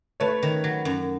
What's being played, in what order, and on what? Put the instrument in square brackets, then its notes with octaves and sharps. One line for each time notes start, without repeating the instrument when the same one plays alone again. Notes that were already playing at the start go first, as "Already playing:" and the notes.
[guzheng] A3 [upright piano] B4 C#5
[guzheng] D#3
F#3
F#2